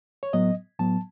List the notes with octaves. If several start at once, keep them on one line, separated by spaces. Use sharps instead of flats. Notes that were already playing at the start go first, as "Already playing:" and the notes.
C#5
A2 F#3 B3 D#5
A2 F#3 B3 A5